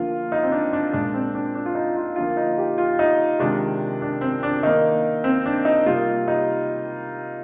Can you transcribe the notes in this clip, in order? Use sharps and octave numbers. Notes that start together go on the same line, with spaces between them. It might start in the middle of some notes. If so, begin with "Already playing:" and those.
Already playing: D3 F3 A#3 F4
D#4
C4
D4
D4
A#2 G#3 D4
C4
D4
D4
F4
D#4
F4
D3 F3 A#3 F4
D#4
G4
F4
D#4
C3 D#3 G#3 D4
D4
C4
D4
D#3 A#3 D#4
C4
D4
D#4
C3 G3 A#3 F4
D#4